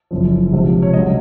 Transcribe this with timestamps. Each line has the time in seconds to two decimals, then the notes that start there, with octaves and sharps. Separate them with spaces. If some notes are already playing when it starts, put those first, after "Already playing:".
0.11 F#1 F#2 F3
0.52 C#2 C3 F3
0.83 C#5
0.93 C#2 C#3 F#3 D#5